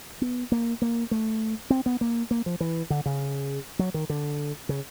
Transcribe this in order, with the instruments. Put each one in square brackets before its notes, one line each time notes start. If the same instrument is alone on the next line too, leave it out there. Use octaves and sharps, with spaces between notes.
[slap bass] B3
A#3
A#3
A3
C4
B3
A#3
A#3
F3
E3
D3
C#3
F#3
D#3
D3
C#3